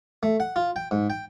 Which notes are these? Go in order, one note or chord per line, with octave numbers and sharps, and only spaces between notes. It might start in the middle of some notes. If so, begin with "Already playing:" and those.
A3
F#5
F4
G5
G#2
G5